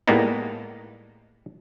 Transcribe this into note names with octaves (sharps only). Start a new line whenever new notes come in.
A2 G3 G#3 A#3 B3 D#4